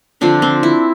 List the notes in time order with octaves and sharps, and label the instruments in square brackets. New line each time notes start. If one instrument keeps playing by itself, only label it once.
[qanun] D3 F3 C4 D4
C4
E4